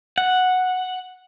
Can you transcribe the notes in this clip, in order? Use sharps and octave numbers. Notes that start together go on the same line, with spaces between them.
F#5